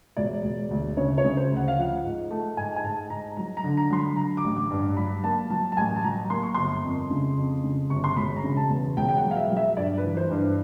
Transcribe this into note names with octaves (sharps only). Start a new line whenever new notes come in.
E1 D5
E1
D2
C#3 C#5
C#5
C#3
C5
D2
F#5
F5
F3 F#5
G#2
A3
G#2 G#5
G#5
G#2 A5
G#2 A#5
F#3 A#5
A#5
D3
A#5
F#3 C6
B5
D3 A#5
D6
A1
D6
G2
F#3 B5
A#3 A5
F#3 A5
A5
A1 G#5
A5
F#3 A#5
A#3 C6
C#6
G1 C6
F2
C#3
F2
C#3
G1 C#6
C6
E1 B5
A#5
C#3
A5
E2
E1 G5
G5
F#5
F#3
F5
E5
F#3
E5
G2 D5
B4
E3
C5
G2
B4